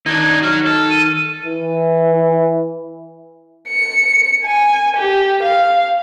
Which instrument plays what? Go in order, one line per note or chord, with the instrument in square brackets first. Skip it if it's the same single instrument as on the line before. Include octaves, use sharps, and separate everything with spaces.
[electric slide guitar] D#3 [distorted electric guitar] D4 D#4 [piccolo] G#6
[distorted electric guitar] F#4 C#5 [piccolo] F6
[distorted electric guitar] A4
[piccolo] D#7
[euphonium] E3
[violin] C#7
G#5
G4
F5